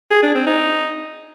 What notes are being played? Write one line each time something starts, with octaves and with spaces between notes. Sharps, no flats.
G#4
D4
C4
D#4